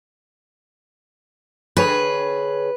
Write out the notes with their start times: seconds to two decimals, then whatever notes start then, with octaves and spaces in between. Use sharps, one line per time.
1.77 D3 G#4 B4 C#5